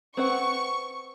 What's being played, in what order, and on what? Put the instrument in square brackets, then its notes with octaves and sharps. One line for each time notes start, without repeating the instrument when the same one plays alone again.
[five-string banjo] C4 B4 F#5 [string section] C#6